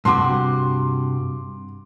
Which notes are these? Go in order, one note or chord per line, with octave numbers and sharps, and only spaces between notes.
G2 C3 F#4 C6 D6